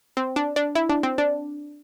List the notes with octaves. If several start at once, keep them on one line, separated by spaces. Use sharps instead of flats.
C4
D4
D4
E4
D4
C4
D4